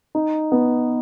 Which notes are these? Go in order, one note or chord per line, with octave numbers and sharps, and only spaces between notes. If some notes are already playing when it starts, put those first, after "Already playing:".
D#4
B3